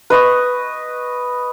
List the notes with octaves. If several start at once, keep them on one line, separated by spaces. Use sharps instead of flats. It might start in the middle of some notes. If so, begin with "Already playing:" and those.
B4 D#5 C#6 D#6